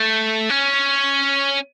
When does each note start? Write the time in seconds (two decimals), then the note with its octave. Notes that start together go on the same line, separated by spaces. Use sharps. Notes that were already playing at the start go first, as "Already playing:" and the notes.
Already playing: A3
0.49 C#4